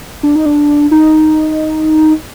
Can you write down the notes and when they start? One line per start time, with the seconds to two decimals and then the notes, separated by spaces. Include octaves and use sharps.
0.23 D4
0.36 D#4
0.46 D4
0.91 D#4